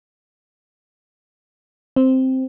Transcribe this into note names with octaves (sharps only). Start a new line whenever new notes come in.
C4